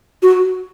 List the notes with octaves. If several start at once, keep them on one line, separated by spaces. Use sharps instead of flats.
F#4